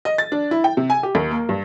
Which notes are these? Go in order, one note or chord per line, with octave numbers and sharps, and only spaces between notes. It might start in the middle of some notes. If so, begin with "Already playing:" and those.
D#5
A6
D4
E4
G5
C3
G#5
G4
D#2
A#3
G2